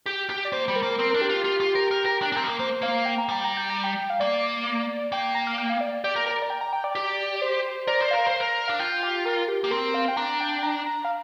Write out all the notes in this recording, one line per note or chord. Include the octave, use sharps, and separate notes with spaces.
G4 G5
G4
D5
A#3 C5
G3
A#4
A#3
C4 A#4
D4 A#4
G4
F4
F4
F4
A#4
A#4
A#4
D4
D4
C4 A#4
G3
A#3
A#3 C5
A#3 F5
G5
A#5
G3 G5
A#5
G5
A#5
G5
F5
A#3 D5
A#3 G5
A#5
F5
G5
F5
D5
G4 D5
A#4
A#4
A#5
G5
A#5
G5
D5
G4
D5
C5
A#4 D5
C5
A#4 F5
C5
A#4
D4 F5
F4 G5
G4
A#4
G4
A#3 G4
C4 A#4
F5
G5
D4 A#5
G5
G5
A#5
A#5
F5